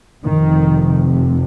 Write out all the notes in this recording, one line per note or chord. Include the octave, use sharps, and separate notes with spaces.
F1 F2 C3 D#3